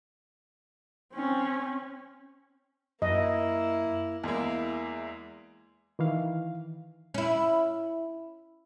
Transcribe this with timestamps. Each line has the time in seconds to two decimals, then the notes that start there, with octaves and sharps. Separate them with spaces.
1.14 C4 C#4
3.02 F#2 A#3 E4 D#5
4.24 E2 G#3 A#3 E4
5.99 D#3 E3 F5
7.14 C#4 E4